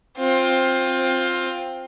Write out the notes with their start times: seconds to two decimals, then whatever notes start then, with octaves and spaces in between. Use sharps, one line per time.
0.18 C4 F4